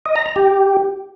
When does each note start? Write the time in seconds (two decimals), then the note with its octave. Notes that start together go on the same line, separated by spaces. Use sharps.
0.06 D#5
0.16 A#5
0.26 A#5
0.36 G4